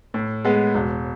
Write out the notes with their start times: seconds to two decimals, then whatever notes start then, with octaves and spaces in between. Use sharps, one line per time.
0.14 A2
0.45 G#3 B3
0.75 E1